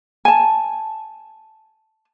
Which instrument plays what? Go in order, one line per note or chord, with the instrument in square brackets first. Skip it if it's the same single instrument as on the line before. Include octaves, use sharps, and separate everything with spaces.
[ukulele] G#5 A5